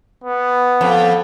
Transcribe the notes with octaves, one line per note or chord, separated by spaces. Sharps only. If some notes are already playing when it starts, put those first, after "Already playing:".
B3
F2